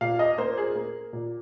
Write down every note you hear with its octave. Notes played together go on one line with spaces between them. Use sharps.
A#2 F5
D#5
A#3 C5
G#4
A#3
A#2